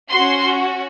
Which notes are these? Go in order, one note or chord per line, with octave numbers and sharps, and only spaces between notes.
C#4 F#4 C6